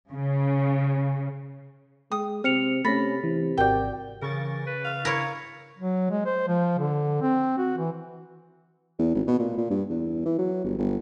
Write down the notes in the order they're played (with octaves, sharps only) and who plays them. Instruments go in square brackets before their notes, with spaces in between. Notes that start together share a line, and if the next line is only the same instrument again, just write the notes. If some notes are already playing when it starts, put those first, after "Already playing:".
[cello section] C#3
[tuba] G#3 [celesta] G5 [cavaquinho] D#6
[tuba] C3 [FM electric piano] C4 [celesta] F6 C#7 F7
[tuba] C3 [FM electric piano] A3 C#4 [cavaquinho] B5 [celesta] A6 A#6
[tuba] C3 [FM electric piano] E3
[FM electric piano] G#1 F#4 D5 [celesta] A#4 G6 [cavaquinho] G5
[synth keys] C#3 C#6 A6 [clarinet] E3 [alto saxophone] A#4
[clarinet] B4
[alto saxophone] F5
[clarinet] E4 [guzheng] A#4 C#5
[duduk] F#3
G#3
C5
F3
D3
C4
F#4
E3
[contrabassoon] E2
G#1
B2
A#2
A#2
G2
E2
E3
F#3
G1
G1